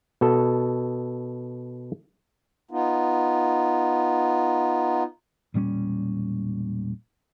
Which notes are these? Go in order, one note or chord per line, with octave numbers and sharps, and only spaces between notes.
B2 A4
B3 D#4 F4
E1 A#2 G3 C#4